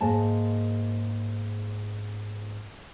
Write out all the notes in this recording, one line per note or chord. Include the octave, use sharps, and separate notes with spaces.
G#2 A#3 G#5 A5